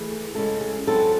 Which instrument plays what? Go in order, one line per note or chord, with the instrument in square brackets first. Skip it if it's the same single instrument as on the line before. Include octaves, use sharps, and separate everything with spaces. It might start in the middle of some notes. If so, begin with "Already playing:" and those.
Already playing: [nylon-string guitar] E3 A3 G#4
C#3 G#3 C#4 E4 A4
G#4
F#3 C4 E4 A4